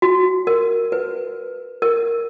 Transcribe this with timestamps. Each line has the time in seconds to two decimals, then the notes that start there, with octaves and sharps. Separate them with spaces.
0.02 F#4
0.47 A#4
0.92 B4
1.82 A#4